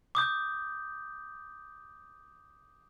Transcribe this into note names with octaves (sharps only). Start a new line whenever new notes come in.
D6 D#6 G6